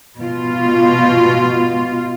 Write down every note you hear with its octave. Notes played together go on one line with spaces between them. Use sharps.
B2 F4